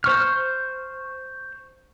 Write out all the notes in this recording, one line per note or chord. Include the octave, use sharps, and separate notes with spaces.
C5 C#6 F6